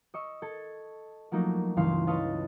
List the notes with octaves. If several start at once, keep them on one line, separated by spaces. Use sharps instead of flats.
D#5 C#6 E6
A4 G#6
F3 F#3 A3 A#3 D#4
C#2 G2 E3 D#4 F5 C6
B4 C#5 D#5 F5 A5